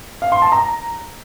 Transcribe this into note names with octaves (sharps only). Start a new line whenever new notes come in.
F5
C6
A5
A#5